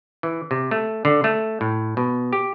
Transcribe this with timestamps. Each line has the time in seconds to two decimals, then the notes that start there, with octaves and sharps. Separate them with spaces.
0.23 E3
0.51 C3
0.71 A3
1.05 D3
1.24 A3
1.61 A2
1.97 B2
2.33 G4